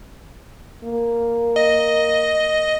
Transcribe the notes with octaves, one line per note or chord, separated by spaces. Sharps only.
A#3
D#5